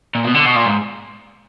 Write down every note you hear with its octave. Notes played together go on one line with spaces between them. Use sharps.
A#2
B2
D3
B2
A#2
G#2